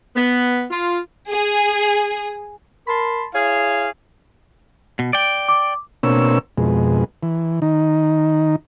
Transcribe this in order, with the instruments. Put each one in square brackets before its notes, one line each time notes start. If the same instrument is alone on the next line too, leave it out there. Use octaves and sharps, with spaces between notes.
[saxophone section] B3
F4
[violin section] G#4
[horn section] A#4 A5 B5 C6
E4 G#4 C#5 F5
[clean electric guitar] B2
D5 G5
[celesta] D6
[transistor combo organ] B2 A#3 C4 D4 C#5 E6
F2 B2 G#3
E3
D#3 D#4